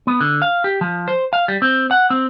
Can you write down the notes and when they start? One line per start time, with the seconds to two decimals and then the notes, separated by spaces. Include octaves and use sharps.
0.07 B3
0.21 D3
0.42 F5
0.64 G4
0.81 F3
1.08 C5
1.33 F5
1.48 G3
1.62 C4
1.91 F#5
2.10 C4